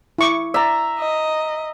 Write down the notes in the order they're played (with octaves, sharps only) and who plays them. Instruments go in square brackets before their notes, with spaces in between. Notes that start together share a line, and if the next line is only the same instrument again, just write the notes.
[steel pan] E4 C#6 D6
[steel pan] D5 [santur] E5 A#5
[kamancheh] D#5